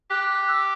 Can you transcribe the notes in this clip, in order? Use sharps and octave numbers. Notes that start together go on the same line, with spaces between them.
G4 F#6
F#6
E6